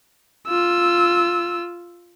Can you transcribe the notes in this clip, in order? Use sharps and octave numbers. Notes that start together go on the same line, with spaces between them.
F4 E6